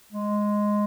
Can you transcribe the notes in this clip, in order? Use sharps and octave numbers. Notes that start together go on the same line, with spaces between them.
G#3